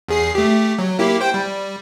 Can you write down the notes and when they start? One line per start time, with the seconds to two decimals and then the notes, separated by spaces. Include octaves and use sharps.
0.08 E2 G#4 C7
0.35 A3 G4
0.79 F#3
0.99 A#3 E4 G4
1.21 C5 G5
1.34 G3